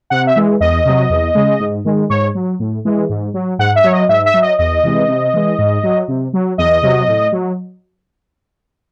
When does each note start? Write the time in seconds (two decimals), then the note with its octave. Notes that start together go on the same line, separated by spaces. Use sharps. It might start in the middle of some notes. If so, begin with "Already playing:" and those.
0.10 C3 F#5
0.27 E5
0.36 E3 G#3
0.60 E2 D#5
0.85 C3 F#3
1.10 E2
1.35 C#3 G#3
1.60 G#2
1.85 D#3 G#3
2.10 G#2 C#5
2.35 F#3
2.59 A2
2.85 E3 G#3
3.09 G#2
3.34 F#3
3.59 G#2 F#5
3.76 E5
3.84 F#3 C#5
3.92 D#5
4.09 G#2 E5
4.26 E5
4.34 F#3
4.42 D#5
4.59 E2 D#5
4.83 C3 E3 G#3
5.08 C3
5.34 E3 G#3
5.58 G#2
5.83 F#3
6.08 C3
6.33 F#3
6.58 E2 D#5
6.83 C3 F#3
7.08 A2
7.32 F#3